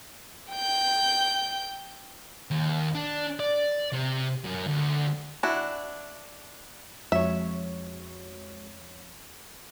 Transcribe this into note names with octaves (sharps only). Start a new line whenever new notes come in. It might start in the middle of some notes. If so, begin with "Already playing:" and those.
G5 G6
D#2
D4
D5
C3
F#2
D2
D4 E4 F#4
F2 F3 G#3 F#4 C#5 E5